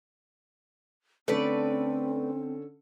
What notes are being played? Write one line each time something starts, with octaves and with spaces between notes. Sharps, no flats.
D3 A3 C4 C#4 A4 B4 D5